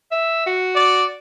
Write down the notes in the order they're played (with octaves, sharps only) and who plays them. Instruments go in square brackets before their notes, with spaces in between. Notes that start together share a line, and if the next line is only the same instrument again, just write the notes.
[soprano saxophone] E5
F#4
[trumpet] D5